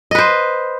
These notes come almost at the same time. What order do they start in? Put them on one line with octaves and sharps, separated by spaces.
D#5 B4 C5